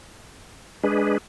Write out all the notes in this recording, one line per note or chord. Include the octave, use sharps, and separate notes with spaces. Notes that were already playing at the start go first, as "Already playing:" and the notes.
G#3 D4 G#4 B4